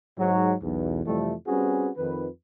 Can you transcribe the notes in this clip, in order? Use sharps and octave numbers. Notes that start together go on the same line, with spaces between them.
G#2 F#3
B1 E2
F2 C3 E3 G3 A3
G3 C4 C#4 F#4 G#4 B4
F2 D#3 B4